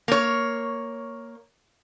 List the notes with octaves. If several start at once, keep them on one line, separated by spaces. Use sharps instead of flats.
A#3 C#5